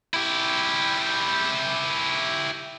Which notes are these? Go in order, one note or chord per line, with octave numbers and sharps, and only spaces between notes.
E4 G4